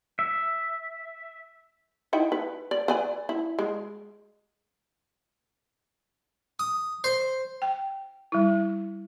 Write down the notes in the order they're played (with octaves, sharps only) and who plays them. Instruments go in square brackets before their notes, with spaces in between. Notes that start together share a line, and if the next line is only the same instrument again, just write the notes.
[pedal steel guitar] E5
[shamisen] D#4 E4 G5
B4
D5
B4 D5 G#5
E4
G#3
[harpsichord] D#6
C5
[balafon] G5
G3 E4